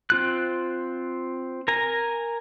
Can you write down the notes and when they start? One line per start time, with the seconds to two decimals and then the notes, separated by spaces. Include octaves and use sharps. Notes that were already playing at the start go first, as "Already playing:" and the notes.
0.10 C4 F4 F#6
1.68 A#4 G#5 A#5